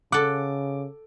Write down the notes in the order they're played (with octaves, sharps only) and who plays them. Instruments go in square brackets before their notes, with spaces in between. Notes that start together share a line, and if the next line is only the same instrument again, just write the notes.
[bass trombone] C#3 [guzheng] A4 F#5 [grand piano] D6